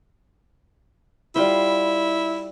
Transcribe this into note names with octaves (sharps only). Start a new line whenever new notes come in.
G3 E4 F4 C5